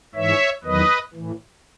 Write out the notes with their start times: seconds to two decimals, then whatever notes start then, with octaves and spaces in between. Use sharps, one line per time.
0.15 G#2 E3 C#5 E5
0.64 E2 D#3 F#3 B4 D#5
1.14 A2 E3